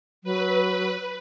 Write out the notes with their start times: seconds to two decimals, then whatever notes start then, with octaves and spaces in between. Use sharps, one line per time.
0.24 F#3 B4